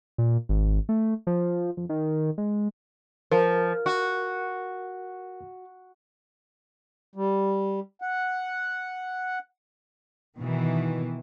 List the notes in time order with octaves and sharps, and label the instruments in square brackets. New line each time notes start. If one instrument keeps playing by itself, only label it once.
[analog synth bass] A#2
G#1
A3
F3
F2
D#3
G#3
[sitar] F3 [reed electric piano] A#4
[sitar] F#4
[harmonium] G3
F#5
[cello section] B2 D#3 E3